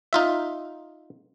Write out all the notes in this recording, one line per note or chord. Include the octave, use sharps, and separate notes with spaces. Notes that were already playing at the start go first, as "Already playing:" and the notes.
D#4 F4 E5